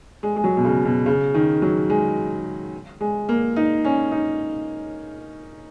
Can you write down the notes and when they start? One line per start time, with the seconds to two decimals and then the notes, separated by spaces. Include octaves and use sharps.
0.23 G#3
0.36 G#3
0.44 F#3
0.57 B2
0.65 C#3
0.85 B2
1.06 C#3
1.34 D#3
1.62 F#3
1.90 G#3
3.01 G#3
3.29 A#3
3.56 D#4
3.85 C#4
4.11 D#4